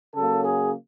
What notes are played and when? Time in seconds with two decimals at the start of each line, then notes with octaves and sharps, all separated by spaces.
0.15 C#3 F#3 A#3 A4
0.45 G#4